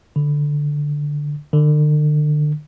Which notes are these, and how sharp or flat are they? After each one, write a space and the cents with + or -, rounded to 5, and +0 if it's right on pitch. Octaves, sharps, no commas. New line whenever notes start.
D3 +0
D3 +35